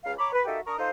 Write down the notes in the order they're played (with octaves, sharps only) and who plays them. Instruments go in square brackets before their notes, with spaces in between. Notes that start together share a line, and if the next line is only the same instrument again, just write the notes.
[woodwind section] C#2 F5
C#5 A#5 B5 D6
B4
A#3 D#4 F#4 G4 A4 E5
D4 A#4 A#5 C#6 D#6
D#4 F4 A4 C5